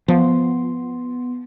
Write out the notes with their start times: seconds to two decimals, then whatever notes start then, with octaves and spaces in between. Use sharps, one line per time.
0.08 F3 B3 C6